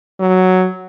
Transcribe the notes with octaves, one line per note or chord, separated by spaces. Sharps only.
F#3